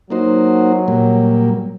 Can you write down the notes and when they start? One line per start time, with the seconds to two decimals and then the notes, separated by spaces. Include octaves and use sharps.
0.10 F#3 A#3 D#4 F#4 C5
0.88 A#2 G3 A#3